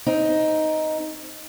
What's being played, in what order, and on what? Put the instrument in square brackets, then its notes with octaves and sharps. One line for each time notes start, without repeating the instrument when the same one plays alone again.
[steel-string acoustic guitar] C4 D#4